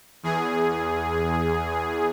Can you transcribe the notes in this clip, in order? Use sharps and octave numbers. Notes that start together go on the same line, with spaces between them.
E2 G#4